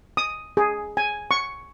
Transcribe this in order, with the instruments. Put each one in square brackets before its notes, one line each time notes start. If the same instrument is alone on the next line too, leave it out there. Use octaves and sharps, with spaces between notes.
[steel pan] D#6
G#4
G#5
C#6